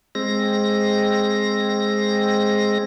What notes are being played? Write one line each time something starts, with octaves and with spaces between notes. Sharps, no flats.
G#3 C4 A#6